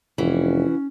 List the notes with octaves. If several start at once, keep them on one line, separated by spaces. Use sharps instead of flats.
F1 E3 C#4 F#4